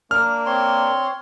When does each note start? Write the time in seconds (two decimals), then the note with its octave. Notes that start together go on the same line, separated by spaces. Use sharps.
0.11 A#3 D4 F6
0.46 C4 C#5 C6